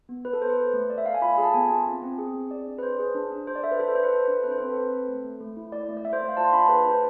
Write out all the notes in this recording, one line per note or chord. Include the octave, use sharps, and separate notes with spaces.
B3
B3 B4
A4
B3 C5
B4
A4
A3
A4 D5
E5
A4 F5
G#5
F4 B5
B5
G#4
A5
B3 G#5
F4
C4
C4
G#4
C4
G#4 D5
D4
B4
G#4 C5
G#4
D4
D4
D4 C5
D5
A4 E5
B4
A4 C5
B4
A4 C5
B4
A4
D4
C4 B4
C5
C4 B4
A4
C4 B4
A4
A3
A3
A3
E4
A3 D5
A3
D5
A3 E5
C5
A3 D5
F5
F4 A5
C6
D4 B5
A5
G#4 B4
B4
D4
C5